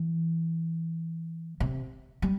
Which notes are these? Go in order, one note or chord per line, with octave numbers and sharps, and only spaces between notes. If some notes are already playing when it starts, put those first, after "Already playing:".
Already playing: E3
C3
G3